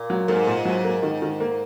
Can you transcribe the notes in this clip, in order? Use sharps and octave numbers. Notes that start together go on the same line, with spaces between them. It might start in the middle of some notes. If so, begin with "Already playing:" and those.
Already playing: A#2
F#3
G#2 A#3
A#2
F#3
A#3
D#3
D#3
A#3